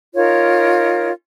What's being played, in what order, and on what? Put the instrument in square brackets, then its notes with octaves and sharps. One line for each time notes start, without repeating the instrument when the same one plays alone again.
[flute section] D#4 F4 A#4 C#5